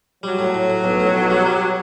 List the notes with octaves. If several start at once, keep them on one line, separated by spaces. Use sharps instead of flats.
F#3 G3
A2
A2
A2
B1
A2
B1
G3
G3